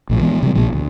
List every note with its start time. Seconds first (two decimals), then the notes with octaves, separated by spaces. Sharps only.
0.10 A#1 A2 F3
0.21 E3 G#3 B3
0.43 C3 G3
0.55 A#1 A#2 F3
0.73 D2